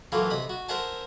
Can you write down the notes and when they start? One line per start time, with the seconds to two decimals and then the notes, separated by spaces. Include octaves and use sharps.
0.12 E3 F#3 A3 A#3 E4 F4
0.30 C3 D#5 B5
0.50 F#4
0.69 A#4 C5 E5 F#5 G#5 A5